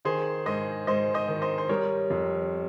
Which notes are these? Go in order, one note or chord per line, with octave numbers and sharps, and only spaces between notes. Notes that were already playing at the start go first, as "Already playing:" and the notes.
D#3 G#4 C5
G#2 C5 D#5
G#2 C5 D#5
C5 D#5
D#3
C5 D#5
C5
G3 A#4 C#5
F2